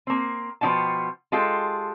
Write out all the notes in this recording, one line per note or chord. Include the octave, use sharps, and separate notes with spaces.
A#3 C4
B2 F3 B3 D#4 G5 A5
G#3 F4 G4 A4